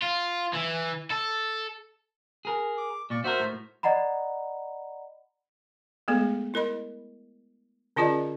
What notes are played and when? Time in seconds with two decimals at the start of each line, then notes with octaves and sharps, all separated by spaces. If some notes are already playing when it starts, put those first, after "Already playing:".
0.02 F4
0.53 E3
1.11 A4
2.45 G#4 A#4
2.78 D6
3.10 A#2 D5 C#6
3.24 F#4 A#4 C5 E5
3.40 A2
3.83 D5 D#5 F#5 A#5 B5
6.08 G#3 A3 B3 G#4 A4
6.54 E4 A#4 D#5 B5
7.96 D3 C#4 F4 G#4 D5 D#5